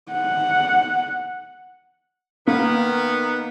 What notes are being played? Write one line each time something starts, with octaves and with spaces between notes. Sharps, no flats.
F#5
D#3 A#3 B3